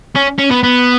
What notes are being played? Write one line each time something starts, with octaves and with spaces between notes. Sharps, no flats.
C#4
C#4
B3
B3